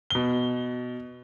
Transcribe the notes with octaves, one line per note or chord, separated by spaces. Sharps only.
B2 G7